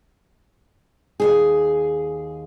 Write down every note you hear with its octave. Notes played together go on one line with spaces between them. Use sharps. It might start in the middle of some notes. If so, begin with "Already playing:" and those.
D#2 G#2 G#4